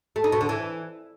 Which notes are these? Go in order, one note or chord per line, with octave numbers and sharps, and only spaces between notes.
A3
D#4
B2
D3
E3